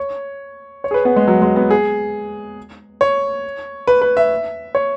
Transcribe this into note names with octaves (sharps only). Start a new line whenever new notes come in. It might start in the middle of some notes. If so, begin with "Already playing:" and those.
Already playing: C#5
C#5
G#4
B4
B3
G#3
F#3
G#3
B3
G#4
C#5
B4
B4
E5
C#5